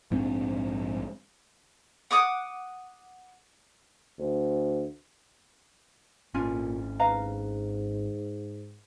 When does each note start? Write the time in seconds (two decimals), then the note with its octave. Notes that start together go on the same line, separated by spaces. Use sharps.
0.11 A#1 G#2 C4 D4
2.11 F#5 D6 D#6
4.19 D2
6.34 G#1 A#2 C#4 F4 G#5
6.99 G#2 B4 F5 A#5